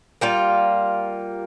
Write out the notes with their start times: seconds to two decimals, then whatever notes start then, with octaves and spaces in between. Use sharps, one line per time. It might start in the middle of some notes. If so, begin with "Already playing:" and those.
0.21 G3 A#3 F4